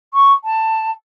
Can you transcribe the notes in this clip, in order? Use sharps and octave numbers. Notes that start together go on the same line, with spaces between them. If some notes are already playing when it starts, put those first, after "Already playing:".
C#6
A5